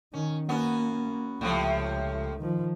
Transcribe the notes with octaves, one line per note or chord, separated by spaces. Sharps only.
D#3 C#4
A#3 B3 C#4 F#4
C#2 A2 C3 F3
D#3 F3